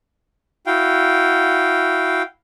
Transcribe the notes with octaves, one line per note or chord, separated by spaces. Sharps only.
E4 F#4 F5 G5